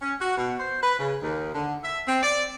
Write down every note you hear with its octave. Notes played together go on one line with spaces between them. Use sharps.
C#4
F#4
B2
C5
B4
C#3
D#2
D3
E5
C4
D5